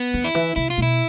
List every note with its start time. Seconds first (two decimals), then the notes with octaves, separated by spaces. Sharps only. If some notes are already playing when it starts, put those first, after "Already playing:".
Already playing: B3
0.14 D3
0.24 E4
0.35 E3
0.56 C3 E4
0.70 F4
0.78 B2 E4